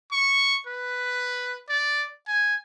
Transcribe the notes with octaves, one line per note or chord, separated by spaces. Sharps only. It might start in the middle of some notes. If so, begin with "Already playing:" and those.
C#6
B4
D5
G#5